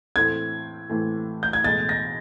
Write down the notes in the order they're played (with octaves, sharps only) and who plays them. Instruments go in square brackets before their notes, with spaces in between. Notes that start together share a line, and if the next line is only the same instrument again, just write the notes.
[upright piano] A2 E3 A3 C4 [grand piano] G#6
[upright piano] A2 E3 A3 C4
[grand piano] G6
G#6
[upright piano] B1 A2 E3 G#3 [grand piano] A6
[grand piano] A#6